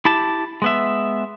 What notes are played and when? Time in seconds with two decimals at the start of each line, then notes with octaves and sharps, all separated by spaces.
0.05 E4 G4 A5
0.62 G#3 B3 E5